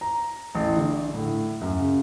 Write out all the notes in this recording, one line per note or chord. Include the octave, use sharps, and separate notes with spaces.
A#5
A1
D3
A2
F#2
C#3